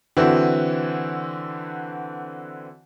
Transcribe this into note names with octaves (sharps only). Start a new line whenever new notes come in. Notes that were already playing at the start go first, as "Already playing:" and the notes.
D3 E3 C4 E4 F#4